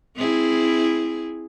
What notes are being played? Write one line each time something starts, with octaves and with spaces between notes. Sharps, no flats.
C4 E4 G#4